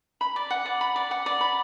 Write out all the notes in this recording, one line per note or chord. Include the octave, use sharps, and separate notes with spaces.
B5
D5
F#5
D5
B5
D5
F#5
D5
B5